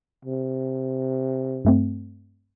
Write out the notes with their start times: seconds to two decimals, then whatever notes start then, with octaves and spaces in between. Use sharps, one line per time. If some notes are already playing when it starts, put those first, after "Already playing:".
0.25 C3
1.65 G2 A3 C4